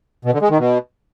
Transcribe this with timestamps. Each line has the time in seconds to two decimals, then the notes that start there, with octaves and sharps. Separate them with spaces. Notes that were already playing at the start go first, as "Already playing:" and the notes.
0.25 B2
0.33 D3
0.42 G#3
0.50 D#3
0.58 B2